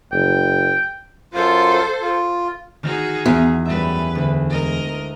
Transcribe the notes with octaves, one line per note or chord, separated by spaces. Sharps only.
F#1 G5
F#2 F4 A4 C5
F4
D#3 D#4 F#4 G#4 F6
E2
F#2 G3 B4 E5
D2
G#3 A#4 D#5